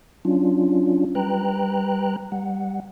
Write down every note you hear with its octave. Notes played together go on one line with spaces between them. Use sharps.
F#3 C#4 D4 F4
G3 B4 G5 A#5 F#6
G3 F#5